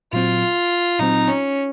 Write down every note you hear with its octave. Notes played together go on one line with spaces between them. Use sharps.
A#2 F#3 C4 F4
A#2 F#3 C4 D#4
C#4